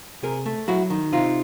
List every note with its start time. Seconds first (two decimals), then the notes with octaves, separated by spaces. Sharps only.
0.23 C3 G#4 A#4
0.46 A3
0.68 F#3 E4 F#4
0.90 D#3
1.12 C3 D#4 F4